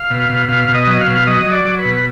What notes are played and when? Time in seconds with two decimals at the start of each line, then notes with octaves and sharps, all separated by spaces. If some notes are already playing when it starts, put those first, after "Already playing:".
Already playing: F5
0.10 B2
0.30 B2
0.49 B2 F5
0.69 B2
0.74 D#5
0.87 F#3
1.01 F5
1.07 B2
1.27 F#3 D#5
1.46 F#3
1.52 D5
1.65 F#3
1.79 B4
1.85 B2